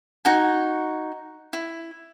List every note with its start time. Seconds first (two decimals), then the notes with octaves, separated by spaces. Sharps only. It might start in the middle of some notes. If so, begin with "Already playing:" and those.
0.25 D#4 F#4 G#5
1.53 E4